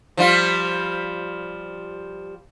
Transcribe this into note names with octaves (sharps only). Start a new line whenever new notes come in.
F3 G3 F4